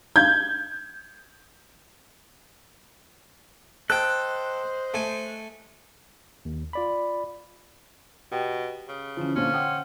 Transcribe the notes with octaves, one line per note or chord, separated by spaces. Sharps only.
G6 G#6
A4 C5 D#5 G5 F#6
A3 G#5
D#2
F4 D5 B5
B2 G4 G5
C#3
D3 E3 F3 C#4
A#2 D3 C#4 C5 F5
F#5 G5 C6 D#6